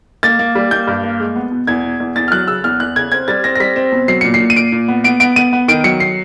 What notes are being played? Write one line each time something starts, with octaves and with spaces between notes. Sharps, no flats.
A#3 A6
A#3
G3
A#3 G6
G2
A#3
G#3
B3
B2
E2 G#6
B2
E2
E2 A6
F6
F#3 F#6
C#3 E6
E2 F6
E2 F#6
C#3 G#6
C4 G#6
G3 A6
C4 A#6
A#6
G3 B6
C4
B2
F#3 C7
A#2 C#7
C7
A#2
D#7
A#2 D7
A#2
B3
B3 D7
B3 D7
B3 D#7
B3
D#3 D7
F#3 C#7
C7